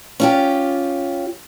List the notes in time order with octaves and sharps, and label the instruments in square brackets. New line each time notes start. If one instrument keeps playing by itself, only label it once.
[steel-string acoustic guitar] C#4 F4 G4